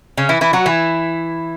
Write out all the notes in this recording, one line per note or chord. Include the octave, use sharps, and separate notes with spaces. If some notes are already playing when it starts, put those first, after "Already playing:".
C#3 C#4
E3 E4
E3 E4
F#3 F#4
E3 E4